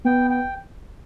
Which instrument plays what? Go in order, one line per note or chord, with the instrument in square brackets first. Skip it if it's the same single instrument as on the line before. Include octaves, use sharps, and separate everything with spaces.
[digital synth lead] B3 [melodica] G5
[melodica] G5